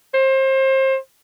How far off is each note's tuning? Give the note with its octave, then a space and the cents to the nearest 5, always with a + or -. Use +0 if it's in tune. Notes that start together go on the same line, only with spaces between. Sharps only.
C5 +30